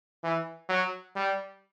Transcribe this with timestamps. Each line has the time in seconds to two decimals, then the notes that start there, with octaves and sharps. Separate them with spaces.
0.23 E3
0.69 F#3
1.15 G3